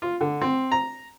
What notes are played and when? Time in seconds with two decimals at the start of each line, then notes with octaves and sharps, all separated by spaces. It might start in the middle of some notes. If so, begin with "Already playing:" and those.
0.02 F4
0.21 D3
0.42 C4
0.72 A#5